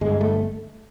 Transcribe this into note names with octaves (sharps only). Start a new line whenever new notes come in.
G1 G#3
A3